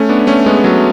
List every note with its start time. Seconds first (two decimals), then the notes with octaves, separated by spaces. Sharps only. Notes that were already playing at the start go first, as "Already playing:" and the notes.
Already playing: A3 C#4
0.09 B3 D4
0.27 A3 C#4
0.46 G#3 B3
0.64 F#3 A3